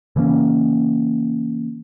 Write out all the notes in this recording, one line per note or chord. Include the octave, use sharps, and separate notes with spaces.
C#3 E3 A#3 C#4